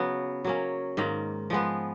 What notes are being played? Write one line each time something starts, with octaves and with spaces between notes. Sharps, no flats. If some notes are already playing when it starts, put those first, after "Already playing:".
Already playing: C#3 F#3 B3
F#3 A#3 C#4
G#2 D#3 A#3
F3 G#3 B3